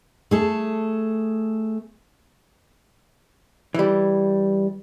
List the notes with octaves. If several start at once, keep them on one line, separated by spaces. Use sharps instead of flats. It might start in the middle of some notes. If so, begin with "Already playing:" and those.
A3 G#4 A4
E3 G3